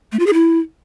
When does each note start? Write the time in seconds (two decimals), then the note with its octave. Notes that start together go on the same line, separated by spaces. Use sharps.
0.12 A3
0.19 F4
0.26 G#4
0.33 E4